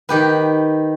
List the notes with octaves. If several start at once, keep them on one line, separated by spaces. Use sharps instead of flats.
D#3 G4 B4